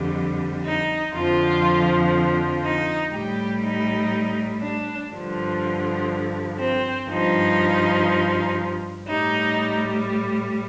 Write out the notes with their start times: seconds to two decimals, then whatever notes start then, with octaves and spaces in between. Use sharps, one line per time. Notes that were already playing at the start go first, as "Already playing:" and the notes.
Already playing: F2 D3 G3
0.64 D#4
1.13 F2 D3 F3 F4
2.62 D#4
3.12 A2 G3 G4
3.61 D#4
4.61 D4
5.10 G2 D3 F3
6.59 C4
7.09 G2 F3 D#4
9.07 A2 G3 D#4